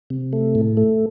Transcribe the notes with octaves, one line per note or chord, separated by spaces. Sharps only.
C3
A3
A2
A3